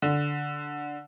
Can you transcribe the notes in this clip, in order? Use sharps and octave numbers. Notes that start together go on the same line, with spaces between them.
D3